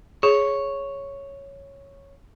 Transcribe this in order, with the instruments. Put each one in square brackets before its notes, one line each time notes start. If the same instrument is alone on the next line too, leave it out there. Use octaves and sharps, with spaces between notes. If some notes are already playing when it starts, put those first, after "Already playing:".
[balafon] G#4 [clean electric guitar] C#5